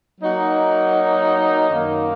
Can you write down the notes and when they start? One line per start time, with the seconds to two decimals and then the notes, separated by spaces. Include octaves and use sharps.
0.20 F#3 A#3 D#4 F#4
1.69 F#2 D#3 A#3